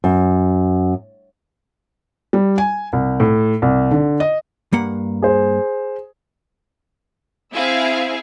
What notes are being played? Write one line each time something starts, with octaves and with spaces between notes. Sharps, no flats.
F#2
G3
G#5
C2
A2
C2
D3
D#5
G2 A#3 F#5
G#4 C5
C4 E4 G#4 E5 F5